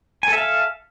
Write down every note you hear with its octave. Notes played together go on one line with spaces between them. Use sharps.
A4 E5 F5 G#5